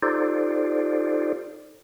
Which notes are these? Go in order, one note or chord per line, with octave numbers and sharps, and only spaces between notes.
D#4 F4 G4 A4 C5 D5